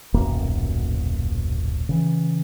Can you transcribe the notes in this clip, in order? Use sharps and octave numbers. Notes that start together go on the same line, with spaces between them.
D#1 B1 F#2 A#3
C#3 E3